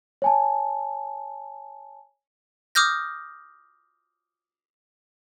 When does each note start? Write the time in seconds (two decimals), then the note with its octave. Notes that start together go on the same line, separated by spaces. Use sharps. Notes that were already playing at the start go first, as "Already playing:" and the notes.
0.22 C#5 G#5 A5
2.75 D6 D#6 F6 G6 A#6